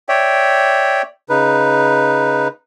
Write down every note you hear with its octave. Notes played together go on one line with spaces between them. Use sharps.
C#5 D5 E5 G5
C#3 D#4 B4